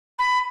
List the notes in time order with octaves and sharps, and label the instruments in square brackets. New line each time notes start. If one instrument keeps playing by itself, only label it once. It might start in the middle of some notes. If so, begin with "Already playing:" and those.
[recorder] B5